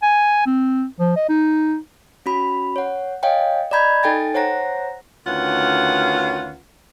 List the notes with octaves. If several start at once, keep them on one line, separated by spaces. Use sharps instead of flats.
G#5
C4
F3
D#5
D#4
C#4 F#4 B5
C#5 F#5
C#5 D#5 F5 G5 G#5
D5 D#5 A#5 B5 G6 G#6
D#4 A4 G5 G#5 A6
C5 C#5 F#5 A#5 A#6
D2 D#3 C#4 F4 B4 F#5